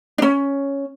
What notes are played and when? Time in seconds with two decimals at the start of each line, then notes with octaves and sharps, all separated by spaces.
0.18 C#4 D4